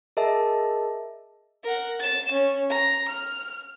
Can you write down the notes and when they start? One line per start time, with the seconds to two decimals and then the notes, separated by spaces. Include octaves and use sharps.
0.17 G#4 A#4 D#5 E5 A5
1.63 A#4 F#5
1.99 A6 E7
2.32 C#4
2.69 A#5
3.09 F6